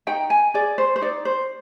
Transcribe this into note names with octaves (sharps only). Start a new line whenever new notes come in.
D#4 G5
G#5
G#4 D5
C5
C5
D#4 D5
C5